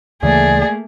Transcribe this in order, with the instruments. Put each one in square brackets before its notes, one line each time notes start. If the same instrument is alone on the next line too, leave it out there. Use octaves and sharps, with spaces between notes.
[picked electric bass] D2 C#3 E3 [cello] A3 A#3 [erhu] G#4 [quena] D5